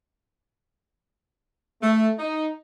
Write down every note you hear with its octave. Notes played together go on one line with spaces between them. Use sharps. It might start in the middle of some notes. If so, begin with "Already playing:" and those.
A3
D#4